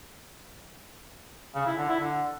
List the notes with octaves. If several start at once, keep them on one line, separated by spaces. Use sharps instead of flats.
C#3
E4
D3
E4
D3